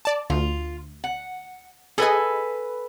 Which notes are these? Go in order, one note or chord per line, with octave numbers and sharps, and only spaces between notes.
D5 A5
D2 F4
F#5
G#4 A4 B4 D#5 G#5